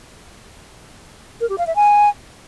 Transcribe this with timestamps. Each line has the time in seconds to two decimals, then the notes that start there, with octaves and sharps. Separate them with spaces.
1.41 A#4
1.49 G4
1.58 F5
1.67 E5
1.76 G#5